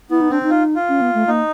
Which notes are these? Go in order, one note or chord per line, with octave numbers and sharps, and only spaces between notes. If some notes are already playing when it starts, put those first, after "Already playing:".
B3 E4
D#4
C4 D4
D#4
F4
F4
C#4
B3
A3
A#3 D#4